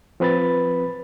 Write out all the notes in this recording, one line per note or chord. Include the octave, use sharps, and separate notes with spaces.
F3 C4 B4 B5 A6